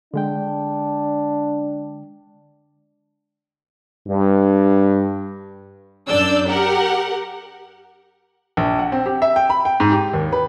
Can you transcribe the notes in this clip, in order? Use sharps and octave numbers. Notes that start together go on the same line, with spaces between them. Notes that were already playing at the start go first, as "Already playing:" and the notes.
D3 G#3 D4 G5
G2
F#2 D4 D5 E6 G6
G4 A#4 F#5
A#1
F#5
C4
G4
E5
G5
B5
G5
G#2
G4
D#2
B4